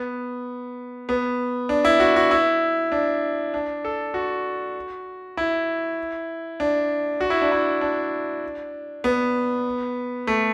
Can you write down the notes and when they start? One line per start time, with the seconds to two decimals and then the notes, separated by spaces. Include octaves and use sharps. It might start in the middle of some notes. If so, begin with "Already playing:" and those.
Already playing: B3
1.09 B3
1.69 D4
1.85 E4
2.00 F#4
2.16 F#4
2.31 E4
2.92 D4
3.54 D4
3.85 A4
4.14 F#4
5.37 E4
6.60 D4
7.21 F#4
7.30 E4
7.42 D4
7.52 E4
7.81 D4
9.04 B3
10.27 A3